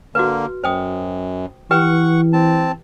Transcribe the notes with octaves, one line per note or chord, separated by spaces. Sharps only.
D3 A#3 F#4 B4
F#2 C5 G5 D#6
E3 G4 B4 F#5 G5 C#6
C4 A5